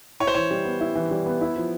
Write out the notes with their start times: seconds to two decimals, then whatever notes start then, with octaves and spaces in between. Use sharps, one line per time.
0.20 E4 C#5
0.27 C5
0.34 E3 C#5
0.51 G3
0.65 B3
0.81 E4
0.95 E3
1.11 G3
1.26 B3
1.41 E4
1.57 F3